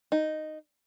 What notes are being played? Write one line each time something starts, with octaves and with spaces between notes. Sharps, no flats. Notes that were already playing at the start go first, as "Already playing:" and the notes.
D#4